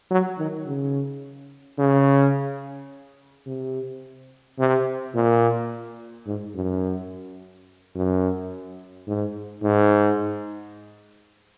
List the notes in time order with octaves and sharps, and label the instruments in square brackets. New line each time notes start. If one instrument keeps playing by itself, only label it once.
[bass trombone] F#3
D#3
C#3
C#3
C3
C3
A#2
G#2
F#2
F#2
G#2
G#2